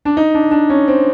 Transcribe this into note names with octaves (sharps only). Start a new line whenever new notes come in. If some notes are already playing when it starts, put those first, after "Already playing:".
D4
D#4
D4
D4
C#4
C4